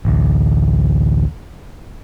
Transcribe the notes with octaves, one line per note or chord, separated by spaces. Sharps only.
A1 D2